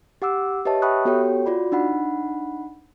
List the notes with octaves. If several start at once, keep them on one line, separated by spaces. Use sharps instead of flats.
G4 F#5 D6 E6
G4 B4 C#5 D#5 E5 A5
E5 G5 B5 C#6 D#6 F#6
B3 F#4 G4 A4 C#5 G5
F4 F#4 D5 B5
D4 D#4 F#5 B5